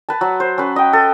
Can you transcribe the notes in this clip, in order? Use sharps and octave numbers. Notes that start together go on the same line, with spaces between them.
B4 A5
F#3
C5
C#4 B4
D#5 G5
A4